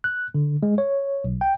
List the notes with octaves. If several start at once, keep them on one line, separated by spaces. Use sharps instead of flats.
F#6
D3
G#3
C#5
B1
G5